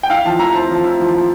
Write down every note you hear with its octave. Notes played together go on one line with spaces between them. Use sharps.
G5
E4 F5
F3 A5
E4 A#5
C4 A5
F3
E4
F3
F3